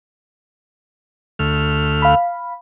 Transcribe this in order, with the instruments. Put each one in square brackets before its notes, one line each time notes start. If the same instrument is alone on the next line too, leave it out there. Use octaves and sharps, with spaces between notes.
[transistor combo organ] D2 A3 F6
[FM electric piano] F5 B5